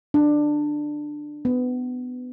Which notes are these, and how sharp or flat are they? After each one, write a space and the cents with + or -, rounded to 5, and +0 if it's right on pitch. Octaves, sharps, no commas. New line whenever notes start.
D4 +15
B3 +20